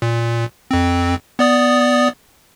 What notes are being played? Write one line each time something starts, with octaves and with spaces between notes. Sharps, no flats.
A#2
F2 C4
B3 D5 D#6